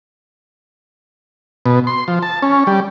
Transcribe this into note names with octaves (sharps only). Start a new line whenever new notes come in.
B2
C6
F3
A5
C#4
G3